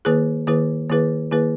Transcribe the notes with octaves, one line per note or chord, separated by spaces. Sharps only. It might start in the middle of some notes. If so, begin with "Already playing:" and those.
D#3 A#3 E4 G#4 B4
D#3 A#3 E4 G#4 B4
D#3 A#3 E4 G#4 B4
D#3 A#3 E4 G#4 B4